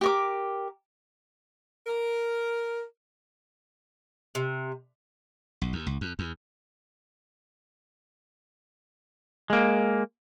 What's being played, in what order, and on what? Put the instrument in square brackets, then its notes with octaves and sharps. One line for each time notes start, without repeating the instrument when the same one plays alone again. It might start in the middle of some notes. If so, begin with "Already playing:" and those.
[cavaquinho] G4 A#4 D6
[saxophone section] A#4
[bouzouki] C3
[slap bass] B1
D#2
C#2
F2
E2
[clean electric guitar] G#3 A#3